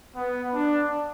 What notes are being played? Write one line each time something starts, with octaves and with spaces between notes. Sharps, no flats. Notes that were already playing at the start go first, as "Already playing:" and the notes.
B3
D4